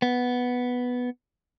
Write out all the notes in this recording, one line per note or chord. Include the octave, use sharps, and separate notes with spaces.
B3